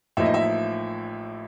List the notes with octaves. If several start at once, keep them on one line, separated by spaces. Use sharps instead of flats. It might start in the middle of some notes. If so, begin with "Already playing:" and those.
A1 A2 F3 A#3 D#4 E5
D#5
E5